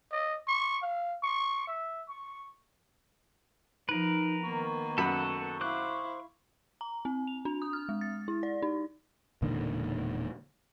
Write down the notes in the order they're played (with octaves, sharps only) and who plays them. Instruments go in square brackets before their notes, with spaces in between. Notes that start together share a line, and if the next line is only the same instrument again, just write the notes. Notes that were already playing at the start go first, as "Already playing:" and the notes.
[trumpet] D#5
C#6
F5
C#6
E5
C#6
[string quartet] F3 [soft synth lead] D#4 [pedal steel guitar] A#4 B4
[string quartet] D#3 A#3 B3 [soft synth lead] C#6
[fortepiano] F#2 B5 [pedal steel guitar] A4 F#5
[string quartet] E4 F5 [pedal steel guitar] C5 D6 F#6
[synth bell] A#5
C4
F7
D4
D#6
F6
G#3
A6
E4
D5
D#4
[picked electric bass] E1 A#2 D3 D#3